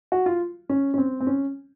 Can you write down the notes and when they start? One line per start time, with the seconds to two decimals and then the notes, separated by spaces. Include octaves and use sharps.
0.12 F#4
0.26 F4
0.69 C#4
0.94 C#4
0.98 C4
1.20 C4
1.27 C#4